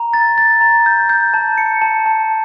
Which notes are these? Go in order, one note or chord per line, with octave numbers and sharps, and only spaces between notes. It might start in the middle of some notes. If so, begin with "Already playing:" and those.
Already playing: A#5
A6
A6
A#5
G6
G6
A5
C#7
A5
A5